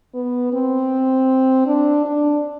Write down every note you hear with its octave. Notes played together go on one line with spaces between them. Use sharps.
B3
C4
D4
D4